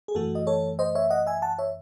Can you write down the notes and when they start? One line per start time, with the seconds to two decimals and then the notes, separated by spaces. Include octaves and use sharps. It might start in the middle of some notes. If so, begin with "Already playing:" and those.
0.08 G#4
0.15 F#2 E3 A3 F#4 A4
0.35 D#5
0.47 A4 C#5
0.79 C5 D#5
0.95 C#5 E5
1.10 D#5 F#5
1.27 E5 G#5
1.42 F#5 A5
1.59 C#5 E5